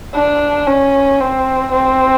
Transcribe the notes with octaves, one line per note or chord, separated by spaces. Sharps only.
D4
C#4
C4
C4